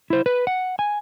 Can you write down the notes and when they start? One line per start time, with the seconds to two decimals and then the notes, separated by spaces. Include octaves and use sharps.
0.10 E4 C5
0.26 B4
0.47 F#5
0.79 G#5